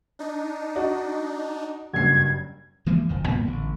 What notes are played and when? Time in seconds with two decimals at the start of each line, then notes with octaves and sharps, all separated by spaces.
0.19 D4 D#4
0.75 F#4 D5 D#5
1.93 F#1 G2 G#6 C7
2.86 E3 F3 G#3 A#3
3.09 F1 F2 D#3
3.28 A2 G3 A#3 B3
3.45 A1 D3